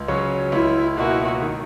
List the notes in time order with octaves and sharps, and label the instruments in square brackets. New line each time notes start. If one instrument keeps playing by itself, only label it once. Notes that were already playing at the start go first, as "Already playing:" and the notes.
Already playing: [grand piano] C#2
C#3 F#3 C#4
[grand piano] C#2 [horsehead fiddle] E4
[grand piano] B2 A#3 E4 A#4 [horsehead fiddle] F#4
[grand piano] D#3